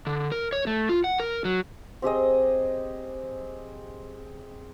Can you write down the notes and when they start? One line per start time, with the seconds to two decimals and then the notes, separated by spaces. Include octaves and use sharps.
0.07 D3
0.32 A#4
0.52 C#5
0.67 A3
0.89 F4
1.04 F#5
1.20 A#4
1.45 F#3
2.02 C4 G4 G#4 D#5